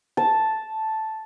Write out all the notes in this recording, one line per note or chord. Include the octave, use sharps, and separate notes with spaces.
A5